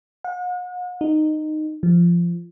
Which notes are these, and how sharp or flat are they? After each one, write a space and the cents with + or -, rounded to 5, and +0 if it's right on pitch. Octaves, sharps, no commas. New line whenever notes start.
F#5 -40
D#4 -10
F3 -15